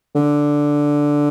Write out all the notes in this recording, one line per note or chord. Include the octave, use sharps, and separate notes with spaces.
D3